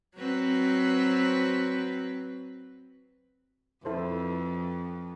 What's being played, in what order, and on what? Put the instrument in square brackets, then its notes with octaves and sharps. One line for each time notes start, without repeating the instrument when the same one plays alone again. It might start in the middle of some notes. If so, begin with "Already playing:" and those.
[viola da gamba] F#3 C4 B4
[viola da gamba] F2 [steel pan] E4 A4 C5 [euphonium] B4